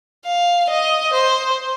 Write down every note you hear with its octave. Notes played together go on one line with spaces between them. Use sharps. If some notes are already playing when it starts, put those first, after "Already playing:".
F5
D#5
C5